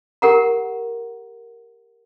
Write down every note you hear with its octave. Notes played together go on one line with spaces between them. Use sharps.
G4 A#4 F#5 A#5